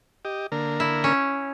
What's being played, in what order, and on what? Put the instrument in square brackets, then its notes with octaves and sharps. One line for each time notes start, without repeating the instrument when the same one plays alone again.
[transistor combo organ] G4 D#5
D3 A#3 A#4
[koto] E4
C#4